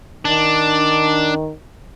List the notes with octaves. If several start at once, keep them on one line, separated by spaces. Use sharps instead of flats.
D#3 D4